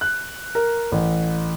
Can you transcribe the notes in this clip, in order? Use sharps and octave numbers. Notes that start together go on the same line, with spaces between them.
F#6
A#4
A1